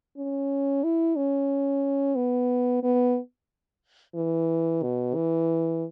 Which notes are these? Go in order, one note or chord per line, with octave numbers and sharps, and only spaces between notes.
C#4
E4
C#4
B3
B3
E3
B2
E3